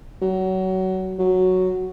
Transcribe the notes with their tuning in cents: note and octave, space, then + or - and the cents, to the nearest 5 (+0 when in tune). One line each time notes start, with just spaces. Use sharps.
F#3 +25
F#3 +0